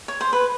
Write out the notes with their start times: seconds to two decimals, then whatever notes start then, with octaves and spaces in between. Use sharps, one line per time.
0.08 C#5
0.21 C5
0.33 B4